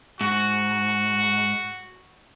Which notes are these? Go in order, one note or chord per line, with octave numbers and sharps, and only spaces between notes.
G#2 F#4